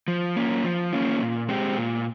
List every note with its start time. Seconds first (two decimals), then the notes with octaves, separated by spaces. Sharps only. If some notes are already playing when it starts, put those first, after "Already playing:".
0.08 F3
0.36 A#3 C#4 F4
0.64 F3
0.93 A#3 C#4 F4
1.21 A#2
1.48 G#3 C4 G4
1.77 A#2